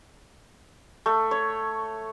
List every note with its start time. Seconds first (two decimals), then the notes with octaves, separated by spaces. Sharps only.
1.06 A3
1.31 C#5